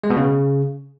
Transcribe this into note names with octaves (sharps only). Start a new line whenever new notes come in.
G#3
B2
C#3